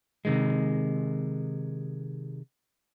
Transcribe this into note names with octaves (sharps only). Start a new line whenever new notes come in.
C3 D#3 G#3